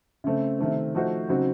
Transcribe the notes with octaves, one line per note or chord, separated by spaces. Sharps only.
C#3 A3 C4
C3 D#3 A3 C4
F3 A3 D#4 F#4 C5
C#3 F#3 C4 D#4 F#4